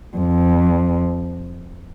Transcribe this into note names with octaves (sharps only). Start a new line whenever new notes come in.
F2